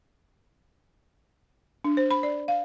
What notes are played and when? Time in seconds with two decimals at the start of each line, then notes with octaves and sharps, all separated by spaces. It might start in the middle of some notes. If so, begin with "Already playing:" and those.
1.84 D4
1.97 C5
2.11 B5
2.23 D5
2.48 F5